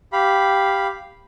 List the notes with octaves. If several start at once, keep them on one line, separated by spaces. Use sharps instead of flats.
G4 F5 B5